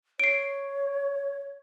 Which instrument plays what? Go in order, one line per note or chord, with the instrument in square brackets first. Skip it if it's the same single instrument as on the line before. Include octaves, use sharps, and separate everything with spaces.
[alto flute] C#5 [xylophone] C7 D7